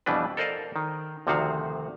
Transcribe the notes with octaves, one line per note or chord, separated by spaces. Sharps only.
F2 B2 E3 G3 D4 B4
A4 A#4 C5 D5 D#5 F5
D#3
D2 C3 D#3 F3 F#4 F5